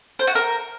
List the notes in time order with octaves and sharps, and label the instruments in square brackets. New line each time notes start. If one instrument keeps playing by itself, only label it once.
[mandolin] C5
F#4
A#4